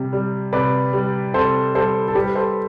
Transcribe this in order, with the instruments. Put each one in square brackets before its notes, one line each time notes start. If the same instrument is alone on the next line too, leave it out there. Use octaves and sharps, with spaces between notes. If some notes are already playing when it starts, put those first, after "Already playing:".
Already playing: [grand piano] C3 G3
G3
C3 B4 D5
G3
C3 A4 C5
G3 A4 C5
A4
G3 G4 B4
A4 C5